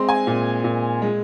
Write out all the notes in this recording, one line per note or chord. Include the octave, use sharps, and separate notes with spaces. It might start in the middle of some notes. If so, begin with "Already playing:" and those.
Already playing: G#3 C4 C6
G#5
A#2
A#2
G#3